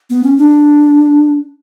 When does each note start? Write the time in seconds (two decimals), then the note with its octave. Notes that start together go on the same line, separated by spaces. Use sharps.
0.10 B3
0.23 C#4
0.38 D4